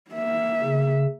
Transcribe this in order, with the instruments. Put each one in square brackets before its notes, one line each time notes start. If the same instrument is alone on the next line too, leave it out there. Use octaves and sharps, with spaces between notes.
[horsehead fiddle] A#3 E5
[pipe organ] C#3